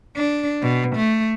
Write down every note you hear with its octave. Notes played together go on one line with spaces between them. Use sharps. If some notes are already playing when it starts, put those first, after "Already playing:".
D4
B2
A3